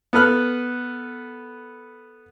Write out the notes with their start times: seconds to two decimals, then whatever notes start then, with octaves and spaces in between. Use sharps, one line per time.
0.13 B3 A4 B4 F6 F#6